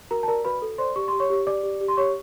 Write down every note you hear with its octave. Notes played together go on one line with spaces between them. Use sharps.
F#4 A#4 A#5
A5
A#4 D5 A#5
F#4 B4 B5
A4
C5 D5 C6
G4 C#6
G4 C6
C#5 C#6
G4
G4 D5 D6
G4
G4
C6
G4 C#5 C#6